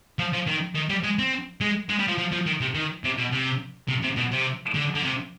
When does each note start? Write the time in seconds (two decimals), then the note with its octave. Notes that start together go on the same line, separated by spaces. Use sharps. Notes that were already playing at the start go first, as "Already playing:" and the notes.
0.19 F3
0.33 F3
0.47 D#3
0.75 D#3
0.89 G3
1.03 G#3
1.19 C4
1.61 G#3
1.89 G#3
1.99 G3
2.08 F3
2.18 F3
2.32 F3
2.46 D#3
2.61 C3
2.75 D#3
3.04 C3
3.17 B2
3.32 C3
3.88 C3
4.03 C3
4.17 B2
4.32 C3
4.75 D3
4.95 D3
5.03 C3